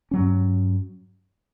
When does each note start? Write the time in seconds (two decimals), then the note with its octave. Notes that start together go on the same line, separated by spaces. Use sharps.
0.11 G2 F#3 C#4